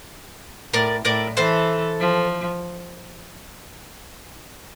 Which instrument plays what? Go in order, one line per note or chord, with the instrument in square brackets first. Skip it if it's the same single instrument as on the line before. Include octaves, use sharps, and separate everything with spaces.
[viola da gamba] A2 [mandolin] A#4 D5
[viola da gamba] A2 [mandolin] A#4 D5
[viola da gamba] E3 [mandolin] A4 C5
[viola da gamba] F3